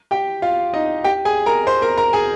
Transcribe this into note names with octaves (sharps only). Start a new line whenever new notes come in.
G4 G5
F4 F5
D#4 D#5
G4 G5
G#4 G#5
A#4 A#5
C5 C6
A#4 A#5
A#4 A#5
G#4 G#5